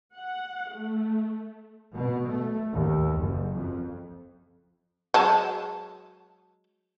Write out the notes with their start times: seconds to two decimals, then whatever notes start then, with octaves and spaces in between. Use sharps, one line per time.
0.14 F#5
0.71 A3
1.95 B2
2.28 A3
2.73 D#2
3.19 F#1
3.55 F2
5.14 F#3 G#3 A5